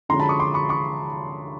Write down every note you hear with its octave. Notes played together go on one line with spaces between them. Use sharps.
D3 F3 G#3 C#4 A#5 C6
A5 B5
C#6 D#6
C6 D6
B5 C#6
B5 C#6